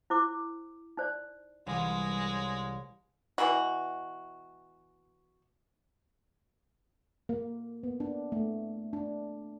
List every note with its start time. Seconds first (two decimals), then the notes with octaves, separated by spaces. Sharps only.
0.10 E4 C5 D6
0.97 D#4 C5 D5
1.66 C2 E3 G#3 C#5
3.38 B2 E3 F3 F#4
7.29 A#3
7.83 B3
8.00 D4
8.32 A3
8.93 D4